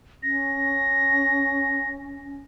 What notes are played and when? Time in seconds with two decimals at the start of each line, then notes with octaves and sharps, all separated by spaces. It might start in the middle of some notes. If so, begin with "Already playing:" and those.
0.23 C#4 A#6